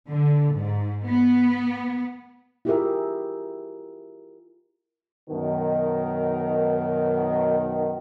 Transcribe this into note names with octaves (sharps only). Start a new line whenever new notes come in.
D3
G#2
B3
E4 F4 G4 G#4 A#4 E5
F#2 B2 D#3